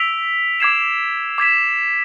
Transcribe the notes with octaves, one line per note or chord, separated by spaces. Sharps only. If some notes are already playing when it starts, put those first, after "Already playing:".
Already playing: E6 B6 D7 F7
D6 G#6 C7 E7
D6 G#6 B6 E7